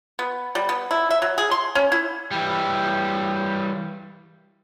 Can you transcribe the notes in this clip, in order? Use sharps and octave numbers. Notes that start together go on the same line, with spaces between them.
B3
G3
B3
E4
E5
F#3
G#4
C6
C#4
E4
E3 G3